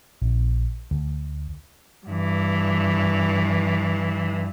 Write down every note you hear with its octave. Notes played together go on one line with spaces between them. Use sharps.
A#1
D2
G2 E3